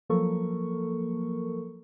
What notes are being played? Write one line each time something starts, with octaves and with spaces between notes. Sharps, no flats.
F3 F#3 A#3 A4 A#4 C#6